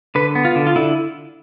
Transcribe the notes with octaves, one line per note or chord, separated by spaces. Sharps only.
D3 B4
B3
F4
D3
F4
D3 E4